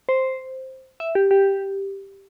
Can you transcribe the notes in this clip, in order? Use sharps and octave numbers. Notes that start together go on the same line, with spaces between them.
C5
E5
G4
G4